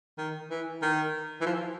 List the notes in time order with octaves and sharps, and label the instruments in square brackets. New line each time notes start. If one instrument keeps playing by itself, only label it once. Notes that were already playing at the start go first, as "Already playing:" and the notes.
[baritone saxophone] D#3
E3
D#3
E3
F3